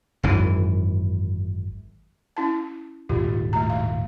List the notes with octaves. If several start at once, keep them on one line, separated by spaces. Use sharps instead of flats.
G#1 F#2 E3
C#4 E4 A5
D#1 G#1 A2 F4 G4
A3 A#5
A3 F5